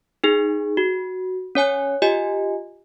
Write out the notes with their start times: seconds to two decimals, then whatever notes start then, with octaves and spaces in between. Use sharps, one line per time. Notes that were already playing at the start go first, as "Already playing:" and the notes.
0.24 D#4 G#4
0.77 F#4
1.55 C#4 C#5 G#5 F#6
2.02 F4 G4 D#5 G#5